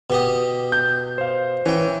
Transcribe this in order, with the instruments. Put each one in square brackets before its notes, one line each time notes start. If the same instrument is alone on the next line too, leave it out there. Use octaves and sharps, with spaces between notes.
[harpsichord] B2 G4 D#5
[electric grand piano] G6
C5 F5
[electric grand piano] E3 [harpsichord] C#4 G5